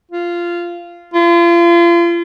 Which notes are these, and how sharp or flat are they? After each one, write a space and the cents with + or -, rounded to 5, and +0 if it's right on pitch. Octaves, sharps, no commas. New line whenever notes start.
F4 -10
F4 -35